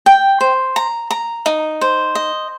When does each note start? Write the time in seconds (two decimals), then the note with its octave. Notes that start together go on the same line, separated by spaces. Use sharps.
0.06 G5
0.41 C5
0.76 A#5
1.11 A#5
1.46 D#4
1.81 C5
2.15 D#5